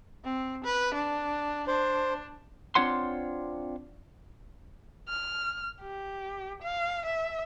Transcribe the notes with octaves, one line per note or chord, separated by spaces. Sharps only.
C4
B4
D4
D4 C5
C4 D4 F4 C#5 F#5 C6
F6
G4
F5
E5